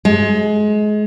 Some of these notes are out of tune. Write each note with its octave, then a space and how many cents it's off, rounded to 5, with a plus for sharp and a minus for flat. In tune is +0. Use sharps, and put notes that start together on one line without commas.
G#3 +25